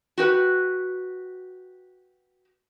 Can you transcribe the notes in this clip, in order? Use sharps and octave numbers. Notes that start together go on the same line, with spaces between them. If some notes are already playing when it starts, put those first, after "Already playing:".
F#4 G4 B4